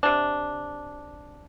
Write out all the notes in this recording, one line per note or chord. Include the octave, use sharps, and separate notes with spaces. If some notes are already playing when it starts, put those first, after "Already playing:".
C3 D4